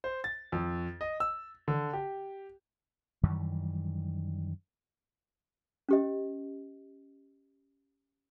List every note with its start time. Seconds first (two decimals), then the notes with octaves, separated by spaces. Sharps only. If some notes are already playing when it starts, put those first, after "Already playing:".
0.04 C5
0.24 A6
0.52 F2
1.01 D#5
1.20 E6
1.68 D3
1.93 G4
3.23 F#2 D#3 E3 G3
5.89 C#4 G4 D#5